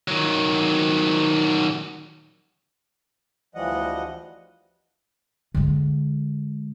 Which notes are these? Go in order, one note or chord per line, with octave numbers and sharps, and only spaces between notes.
D#3 F#3
D2 E3 F3 G3 D#5 F#5
D3 G#3